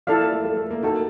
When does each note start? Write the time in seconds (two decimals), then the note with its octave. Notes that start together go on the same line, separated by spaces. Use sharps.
0.07 F3 E4 A4 D5 F5
0.20 A#3
0.32 A3
0.45 A3
0.57 A3
0.71 A#3
0.83 A#3 D#4 F#4 A4